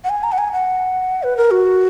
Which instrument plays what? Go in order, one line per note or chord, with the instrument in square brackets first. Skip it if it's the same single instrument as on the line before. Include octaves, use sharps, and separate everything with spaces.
[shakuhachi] F#5
G#5
A#5
F#5
G#5
F#5
B4
A#4
F#4